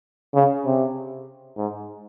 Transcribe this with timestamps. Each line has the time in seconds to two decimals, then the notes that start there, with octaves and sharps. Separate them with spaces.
0.35 C#3
0.66 C3
1.58 G#2